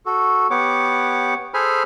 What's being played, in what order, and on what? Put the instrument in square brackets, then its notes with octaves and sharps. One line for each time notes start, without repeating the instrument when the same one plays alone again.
[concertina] F#4 A4
B3 G4 C#5 F#5 D6
G#4 A4 C5 G#5 B5 F6